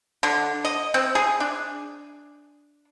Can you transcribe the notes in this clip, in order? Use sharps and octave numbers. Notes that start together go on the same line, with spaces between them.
D3
D#5
C4
G#4
D4